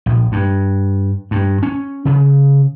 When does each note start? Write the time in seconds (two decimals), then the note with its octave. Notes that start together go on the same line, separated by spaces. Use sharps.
0.06 A#1
0.32 G2
1.31 G2
1.63 C#4
2.05 C#3